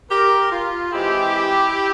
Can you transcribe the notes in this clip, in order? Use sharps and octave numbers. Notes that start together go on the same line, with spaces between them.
G4 A#4
F4
E3 G#3 C4 E4 G4